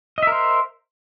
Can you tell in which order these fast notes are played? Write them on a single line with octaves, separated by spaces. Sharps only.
D#5 E5 A#4 C5